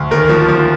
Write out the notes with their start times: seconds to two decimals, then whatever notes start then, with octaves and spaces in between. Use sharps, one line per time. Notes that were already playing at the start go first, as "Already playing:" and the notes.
Already playing: D2
0.11 D#2 A#4
0.29 F3
0.48 F3